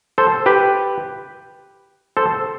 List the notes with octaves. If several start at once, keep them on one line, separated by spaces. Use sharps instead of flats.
A4 C5
G4 B4
A4 C5